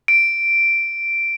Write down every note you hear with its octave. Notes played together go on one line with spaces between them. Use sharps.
D7